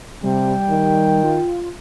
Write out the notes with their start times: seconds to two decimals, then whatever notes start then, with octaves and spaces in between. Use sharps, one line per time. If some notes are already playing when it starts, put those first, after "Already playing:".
0.23 C3 G3 G5
0.70 D#3
1.23 F4